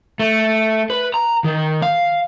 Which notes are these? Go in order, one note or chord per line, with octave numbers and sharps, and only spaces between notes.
A3
B4
A#5
D#3
F5